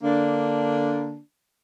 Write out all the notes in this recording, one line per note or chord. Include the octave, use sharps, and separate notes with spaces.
D3 A#3 D4